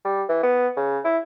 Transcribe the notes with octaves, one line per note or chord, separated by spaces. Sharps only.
G3
E3
B3
C#3
E4